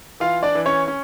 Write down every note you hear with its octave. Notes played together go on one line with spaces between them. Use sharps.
E3 F4 F5
D4 D5
E3
C#4 C#5
C#4